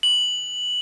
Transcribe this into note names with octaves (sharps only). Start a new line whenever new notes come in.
F#7